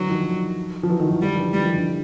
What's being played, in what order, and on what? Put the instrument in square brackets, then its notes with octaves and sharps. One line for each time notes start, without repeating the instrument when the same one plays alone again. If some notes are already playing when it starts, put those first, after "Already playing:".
Already playing: [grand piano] D3 E3 [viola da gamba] F#3
[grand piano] D#3 F3
F3
E3 F#3
D#3 F3
E3 F#3
[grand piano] D#3 F3 [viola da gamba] G3
[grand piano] D3 E3
[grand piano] D3 E3 [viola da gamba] G3
[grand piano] D#3 F3
D3 E3